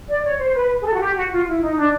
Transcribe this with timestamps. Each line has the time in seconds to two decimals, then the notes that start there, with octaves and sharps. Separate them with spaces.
0.09 D5
0.24 C#5
0.39 C5
0.54 B4
0.81 G#4
0.85 A4
0.93 F#4
1.00 G4
1.15 F#4
1.31 F4
1.46 E4
1.60 D#4
1.76 D4